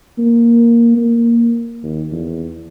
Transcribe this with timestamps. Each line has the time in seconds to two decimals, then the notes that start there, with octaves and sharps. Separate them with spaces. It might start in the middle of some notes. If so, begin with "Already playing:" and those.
0.18 A#3
0.97 A#3
1.83 D#2
2.12 E2